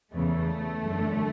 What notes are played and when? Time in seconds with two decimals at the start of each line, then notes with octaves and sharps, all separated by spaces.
0.12 E2 C#3 E3 A3
0.84 F#2
0.89 D3